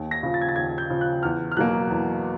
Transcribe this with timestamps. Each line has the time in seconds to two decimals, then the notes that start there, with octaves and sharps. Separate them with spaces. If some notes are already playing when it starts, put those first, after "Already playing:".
Already playing: D#2
0.11 A#6
0.23 C#3 F3
0.34 A6
0.41 G#6
0.49 A6
0.56 D#2 G#6
0.78 G6
0.90 C#3 F3
1.01 F#6
1.23 E2 F6
1.52 F6
1.57 B2 F#3 A#3 F#6
1.91 E2